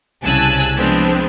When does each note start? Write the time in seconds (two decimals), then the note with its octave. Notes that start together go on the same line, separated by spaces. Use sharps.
0.24 C2 C#3 G#5 A5 E6 F#6
0.77 F3 G#3 B3 C4 D4